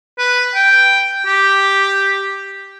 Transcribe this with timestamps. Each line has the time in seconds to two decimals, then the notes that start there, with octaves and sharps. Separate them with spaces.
0.19 B4
0.55 G5
1.26 G4